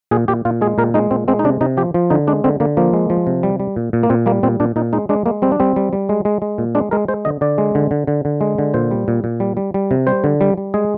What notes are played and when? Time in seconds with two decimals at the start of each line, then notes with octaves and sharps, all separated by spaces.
0.11 A#2 G#4
0.28 A#2 G4
0.45 A#2 F4
0.61 G#3 G#4
0.78 A#2 A#4
0.94 G#3 D#4
1.11 A#2 C4
1.28 G#3 C4
1.39 D#4
1.44 C3 D4
1.61 C3 D#4
1.77 F3 G4
1.94 F3
2.10 D3 D#4
2.27 G#3 D4
2.44 D3 C4
2.60 D3 A#3
2.77 F3 A#3
2.93 G#3
3.10 F3
3.27 C3
3.43 G3
3.60 G3
3.76 A#2
3.93 A#2
4.03 A#3
4.10 A#2 C4
4.26 G3 A#3
4.43 A#2 C4
4.60 A#2 D4
4.76 A#2 D#4
4.93 G#3 D#4
5.09 G#3 D4
5.26 G#3 A#3
5.42 G3 C4
5.52 D4
5.60 G3 C4
5.76 G3
5.93 G3
6.09 G#3
6.25 G#3
6.42 G#3
6.58 A#2
6.75 G#3 D4
6.91 G#3 A#4
7.08 G#3 C5
7.25 D3 D#5
7.41 D3 D5
7.58 G#3
7.75 D3
7.91 D3
8.07 D3
8.25 D3
8.41 G#3
8.58 D3
8.74 A#2 C5
8.91 G3
9.08 A#2
9.24 A#2
9.40 G3
9.57 G3
9.74 G3
9.91 C3
10.07 G3 C5
10.24 D3
10.41 G3
10.58 G3
10.74 G#3 G#4